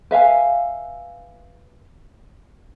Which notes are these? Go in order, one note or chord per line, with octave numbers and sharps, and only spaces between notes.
B4 E5 F5 G#5